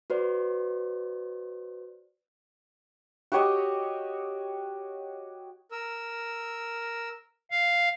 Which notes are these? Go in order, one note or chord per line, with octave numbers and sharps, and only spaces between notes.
F#4 B4 C5 D5
F#4 G4 C#5 D#5
A#4 E6
F5